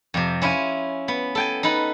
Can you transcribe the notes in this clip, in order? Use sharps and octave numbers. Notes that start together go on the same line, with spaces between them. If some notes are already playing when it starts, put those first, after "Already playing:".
F2 C3
C#4 E4 F4 G#5
B3
A4 G5 G#5
D#4 A4 B4 B5